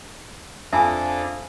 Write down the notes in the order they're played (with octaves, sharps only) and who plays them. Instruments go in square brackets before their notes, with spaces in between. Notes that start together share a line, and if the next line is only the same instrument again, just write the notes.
[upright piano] F2 [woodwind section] F3 [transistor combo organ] D4 A4 [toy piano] E5 G#5